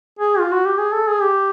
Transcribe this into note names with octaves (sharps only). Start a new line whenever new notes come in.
G#4
F4
F#4
G4
G#4
A4
G#4
G4